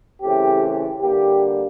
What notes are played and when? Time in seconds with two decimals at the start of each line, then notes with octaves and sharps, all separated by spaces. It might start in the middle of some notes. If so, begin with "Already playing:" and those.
0.22 C#3 E3 A3 C4 G4
1.01 D3 G3 A#3 G4